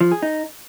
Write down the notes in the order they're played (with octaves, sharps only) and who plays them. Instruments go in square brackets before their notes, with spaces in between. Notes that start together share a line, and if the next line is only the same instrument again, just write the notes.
[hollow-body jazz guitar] F3
G#4
D#4